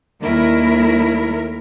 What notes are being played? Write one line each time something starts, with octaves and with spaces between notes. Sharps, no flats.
D#2 G3 A3 E4 A#4